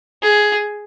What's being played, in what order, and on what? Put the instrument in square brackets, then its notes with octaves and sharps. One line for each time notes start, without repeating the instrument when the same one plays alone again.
[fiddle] G#4